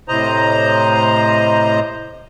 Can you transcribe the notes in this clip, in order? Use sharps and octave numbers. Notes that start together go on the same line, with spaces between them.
A2 C3 C5 D#5 A#5